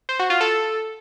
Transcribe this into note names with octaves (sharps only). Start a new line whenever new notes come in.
C5
F#4
F4
A4